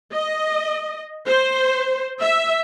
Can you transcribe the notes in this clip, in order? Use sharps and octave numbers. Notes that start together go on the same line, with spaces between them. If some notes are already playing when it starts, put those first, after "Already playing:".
D#5
C5
E5